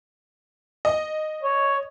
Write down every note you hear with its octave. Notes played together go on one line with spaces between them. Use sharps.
D#5
C#5